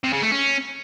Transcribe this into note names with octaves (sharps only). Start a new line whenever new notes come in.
C3
C#3
A3
C#4